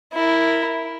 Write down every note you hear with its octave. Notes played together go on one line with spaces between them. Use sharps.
E4 A#4